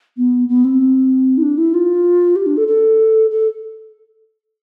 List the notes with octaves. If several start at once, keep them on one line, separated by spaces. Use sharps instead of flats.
B3
B3
C4
E4
D4
E4
F4
G4
D4
A4
A4
A4